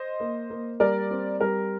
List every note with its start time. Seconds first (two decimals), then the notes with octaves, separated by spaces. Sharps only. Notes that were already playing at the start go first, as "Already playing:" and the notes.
Already playing: C5 D#5
0.20 A#3
0.50 A#3
0.80 G3 A#4 D5
1.11 C4
1.41 G3 A#4